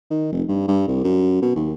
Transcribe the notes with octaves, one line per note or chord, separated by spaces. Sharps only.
D#3
F1
G2
G2
C2
F#2
B2
D#2